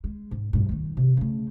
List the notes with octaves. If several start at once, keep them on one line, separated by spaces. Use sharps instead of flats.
G#3
G#2
G2 A#2
D#3 D#4
C3
C#3 A3